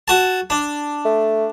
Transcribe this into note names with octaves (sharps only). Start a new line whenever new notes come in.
F#4 A5
D4
A3